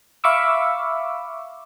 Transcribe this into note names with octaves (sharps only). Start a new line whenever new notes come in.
E5 F5 B5 C#6 D6 E6